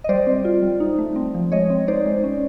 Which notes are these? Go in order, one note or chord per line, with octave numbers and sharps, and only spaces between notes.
D#5
G3 C5 D5
C4
F4
G3
D#4
A3
C4
F3
G#3 C#5 D#5
C4
D#4 C5 D5
G#3
C#4